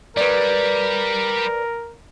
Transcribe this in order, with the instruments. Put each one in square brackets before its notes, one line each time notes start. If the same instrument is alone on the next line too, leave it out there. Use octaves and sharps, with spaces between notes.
[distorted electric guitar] G3 [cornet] A#4 [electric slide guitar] B4 D5